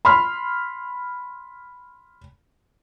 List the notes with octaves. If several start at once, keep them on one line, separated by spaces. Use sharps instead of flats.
B5 C6 F6